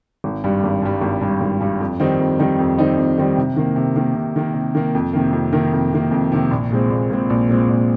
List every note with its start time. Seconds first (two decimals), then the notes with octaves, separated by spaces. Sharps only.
0.24 G#1
0.44 G2 G3
0.63 G#1
0.82 G2 G3
1.01 G#1
1.21 G2 G3
1.41 G#1
1.61 G2 G3
1.80 F2
2.00 D#3 G3 C4 D#4
2.20 F2
2.39 D#3 G3 C4 D#4
2.59 F2
2.78 D#3 G3 C4 D#4
2.98 F2
3.18 D#3 G3 C4 D#4
3.37 C3
3.56 D#3 A#3
3.76 C3
3.96 D#3 A#3
4.15 C3
4.36 D#3 A#3
4.54 C3
4.75 D#3 A#3
4.95 F2
5.13 C3 D#3 A#3
5.33 F2
5.53 C3 D#3 A#3
5.73 F2
5.93 C3 D#3 A#3
6.11 F2
6.32 C3 D#3 A#3
6.51 A#1
6.70 A#2 G#3 C4
6.90 A#1
7.10 A#2 G#3 C4
7.30 A#1
7.48 A#2 G#3 C4
7.69 A#1